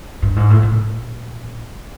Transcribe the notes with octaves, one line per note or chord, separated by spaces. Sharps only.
G2
G#2
A2
A#2